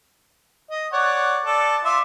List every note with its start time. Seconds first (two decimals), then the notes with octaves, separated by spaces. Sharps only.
0.71 D#5
0.93 C#5 D5 F#5
1.45 A4 D5
1.85 F4 E5 D6